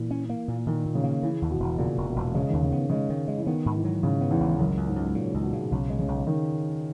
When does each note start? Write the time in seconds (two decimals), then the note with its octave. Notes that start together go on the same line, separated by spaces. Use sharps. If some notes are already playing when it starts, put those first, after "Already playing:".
Already playing: A#2 E3
0.11 C#4
0.29 A#3
0.48 A#2
0.66 A#2 D#3
0.86 A#2
0.95 C#3
1.04 A#3
1.23 C#3 E3
1.42 D#2
1.51 B2
1.60 E1
1.78 A#2 C#3
1.98 E1
2.07 B2
2.16 E1
2.35 C#3 G#3
2.49 D#2 D#3
2.62 C#3
2.72 D#3 B3
2.89 C#3 G#3
3.09 D#3
3.28 G#3
3.38 E3
3.47 D#3 B3
3.66 G#2
3.75 E3
3.84 F#3
4.03 G#2 C#3
4.21 B3
4.31 E2
4.40 G#1
4.59 C#2 F#2
4.77 C#2
4.87 G#2
4.96 C#2
5.15 A#2 C#3
5.34 C#2
5.43 B2
5.53 C#3
5.71 B1 C#3
5.90 G#3
5.99 C#3
6.08 B1
6.27 D#3